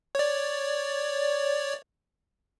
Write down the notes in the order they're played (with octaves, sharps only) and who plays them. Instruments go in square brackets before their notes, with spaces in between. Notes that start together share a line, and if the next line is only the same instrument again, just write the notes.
[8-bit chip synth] C#5 D5